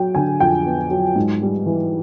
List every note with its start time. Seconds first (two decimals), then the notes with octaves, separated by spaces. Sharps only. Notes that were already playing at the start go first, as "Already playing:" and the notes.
Already playing: F#3 G5
0.15 D3 G#5
0.40 F2 G5
0.65 B3
0.91 F#3
1.16 G#2
1.42 G3
1.66 E3